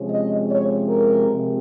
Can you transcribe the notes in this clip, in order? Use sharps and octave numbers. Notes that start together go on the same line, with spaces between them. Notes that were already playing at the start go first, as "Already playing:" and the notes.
Already playing: C3 F3 G#3 C#4
D#5
C#5
A#4
C3 F3 G#3